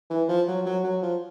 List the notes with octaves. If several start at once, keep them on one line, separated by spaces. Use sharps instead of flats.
E3
F3
F#3
F#3
F#3
F3